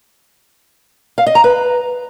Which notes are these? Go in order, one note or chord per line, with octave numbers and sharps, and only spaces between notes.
F5
D#5
A#5
B4